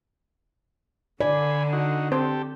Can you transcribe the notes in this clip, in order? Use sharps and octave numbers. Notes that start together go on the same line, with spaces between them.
D3 D5 G#5 B5
D#4 F#4
C4 G4 A4 C5